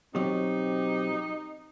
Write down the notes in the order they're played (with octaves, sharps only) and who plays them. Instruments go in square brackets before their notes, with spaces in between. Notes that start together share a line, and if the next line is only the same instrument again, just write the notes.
[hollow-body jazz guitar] B2 F#3 [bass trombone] C4 [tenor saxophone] D#4 [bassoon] G4